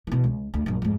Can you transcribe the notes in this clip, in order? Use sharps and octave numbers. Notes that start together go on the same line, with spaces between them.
B2 E3
C#2
D2
A#1 F#2
F2 G#2